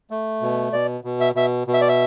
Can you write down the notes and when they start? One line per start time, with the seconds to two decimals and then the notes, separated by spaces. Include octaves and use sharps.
0.11 A3
0.41 B2
0.73 B2 D5
1.04 B2
1.21 E5
1.35 B2 E5
1.67 B2
1.74 E5
1.81 D5
1.89 E5